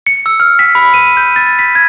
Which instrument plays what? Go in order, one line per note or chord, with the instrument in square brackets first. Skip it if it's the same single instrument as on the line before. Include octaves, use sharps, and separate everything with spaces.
[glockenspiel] C#7
E6
F6
B6
B5
D#7
G6
A6
B6
G#6